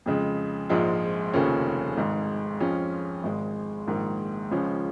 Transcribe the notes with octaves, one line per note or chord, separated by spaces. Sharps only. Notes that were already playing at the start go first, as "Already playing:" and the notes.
F2 C#3 G#3
A#1 G#2 F3 G#3 F4
F1 D#2 C#3 F3 C#4
G#1 G#2 G#3
F2 F3 G#3 C#4 F4
G#1 G#2 G#3
A#1 G#2 D#3 A#3
C#2 C#3 F3 G#3 C#4